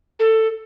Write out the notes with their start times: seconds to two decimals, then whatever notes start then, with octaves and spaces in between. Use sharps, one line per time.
0.20 A4